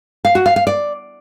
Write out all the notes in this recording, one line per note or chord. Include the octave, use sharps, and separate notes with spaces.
F5
F#4
F5
F5
D5